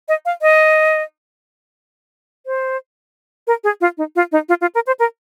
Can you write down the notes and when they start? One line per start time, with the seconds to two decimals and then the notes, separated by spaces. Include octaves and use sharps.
0.08 D#5
0.25 F5
0.42 D#5
2.46 C5
3.47 A#4
3.64 G#4
3.81 F4
3.98 D#4
4.16 F4
4.32 D#4
4.49 F4
4.61 F4
4.75 A#4
4.87 C5
4.99 A#4